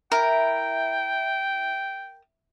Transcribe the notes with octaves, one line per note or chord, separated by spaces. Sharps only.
E4 A#4 G5